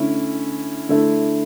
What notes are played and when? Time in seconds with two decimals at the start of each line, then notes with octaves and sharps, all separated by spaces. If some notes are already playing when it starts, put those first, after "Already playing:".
Already playing: D3 A3 C#4 E4
0.89 D3 A3 E4